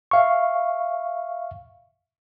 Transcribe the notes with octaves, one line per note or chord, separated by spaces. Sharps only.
E5 F5 C#6